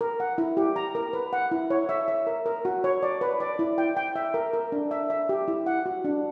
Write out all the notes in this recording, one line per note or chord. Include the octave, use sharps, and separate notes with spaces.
A#4
F#5
E4
G4
A#5
A#4
B4
F#5
E4
C#5
E5
E5
A#4
A#4
F#4
C#5
D5
B4
D5
E4
G5
G5
E5
A#4
A#4
D4
E5
E5
G4
E4
F#5
F#4
D4